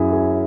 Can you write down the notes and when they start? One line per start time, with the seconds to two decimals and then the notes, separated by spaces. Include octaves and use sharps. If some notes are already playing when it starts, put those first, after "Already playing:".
Already playing: F#2 E4 F#4 G#4 E5
0.13 G#4